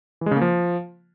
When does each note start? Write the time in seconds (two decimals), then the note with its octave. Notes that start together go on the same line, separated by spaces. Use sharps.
0.21 E3
0.26 G#3
0.31 C#3
0.36 A#3
0.41 F3